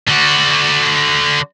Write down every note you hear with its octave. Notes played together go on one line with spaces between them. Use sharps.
D3 F#4